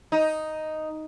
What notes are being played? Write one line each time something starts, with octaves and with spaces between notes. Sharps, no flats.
D#4